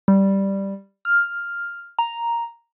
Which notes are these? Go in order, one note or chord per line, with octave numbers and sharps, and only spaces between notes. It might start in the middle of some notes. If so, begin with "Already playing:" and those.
G3
F6
A#5